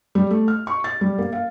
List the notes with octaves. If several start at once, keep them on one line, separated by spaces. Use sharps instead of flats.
G3
A3
F6
C#6
A6
G3
A#3
F5